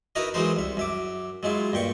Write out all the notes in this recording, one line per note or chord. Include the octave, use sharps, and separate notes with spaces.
D#4 E4 F#4 A#4 B4 D#5
E3 F#3 G#3 D#4 A#4 C5
C2 E5
F#2 E5 D6
F#3 G#3 E4 F4
G2 A#2 G5 C#6